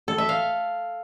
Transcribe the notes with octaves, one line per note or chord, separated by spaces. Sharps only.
A4
E5
F5